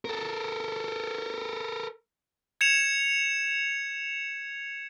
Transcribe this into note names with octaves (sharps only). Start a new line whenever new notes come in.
A4 A#4
G#6 C#7 E7 F7